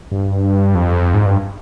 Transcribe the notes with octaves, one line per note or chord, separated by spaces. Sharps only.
G2
F2
G#2
G2